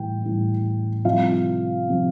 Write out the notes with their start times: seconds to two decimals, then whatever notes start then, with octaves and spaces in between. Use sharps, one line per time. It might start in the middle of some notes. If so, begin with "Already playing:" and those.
Already playing: A2 E3 G3 G5
0.22 A2 E3 G3
1.04 C2 C3 F3 F4 F5
1.89 C3 F3